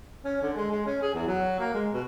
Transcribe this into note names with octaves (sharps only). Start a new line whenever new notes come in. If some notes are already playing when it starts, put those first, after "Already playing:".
C#4
D3
G#3
G#3
C#4
G#4
E2
F#3
A#3
G#3
B2